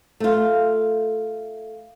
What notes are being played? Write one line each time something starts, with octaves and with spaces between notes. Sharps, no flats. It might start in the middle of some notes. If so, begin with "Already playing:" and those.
A3 F4